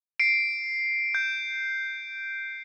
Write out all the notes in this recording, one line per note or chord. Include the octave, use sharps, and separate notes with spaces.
C7 D7
G6